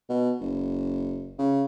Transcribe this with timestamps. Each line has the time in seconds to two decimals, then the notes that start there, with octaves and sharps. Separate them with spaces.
0.09 B2
0.41 F#1
1.38 C#3